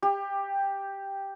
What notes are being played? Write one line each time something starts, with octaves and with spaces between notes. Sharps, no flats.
G4